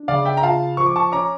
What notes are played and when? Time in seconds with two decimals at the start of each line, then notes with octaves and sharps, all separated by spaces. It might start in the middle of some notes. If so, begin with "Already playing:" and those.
Already playing: D4
0.08 C#3 D5 F5
0.25 E5 G5
0.37 A#5
0.43 F4 F5 A5
0.77 F3 C#6
0.86 D6
0.96 A5 C#6
1.12 C#4 A#5 D6